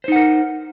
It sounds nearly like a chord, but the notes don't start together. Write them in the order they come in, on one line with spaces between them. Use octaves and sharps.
C5 D#4 F#5 A#4